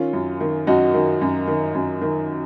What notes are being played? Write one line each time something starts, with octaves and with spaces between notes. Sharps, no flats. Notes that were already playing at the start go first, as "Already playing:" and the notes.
Already playing: D#3 C#4 F4
F#2
D#3
F#2 D#4 F#4
D#3
F#2
D#3
F#2
D#3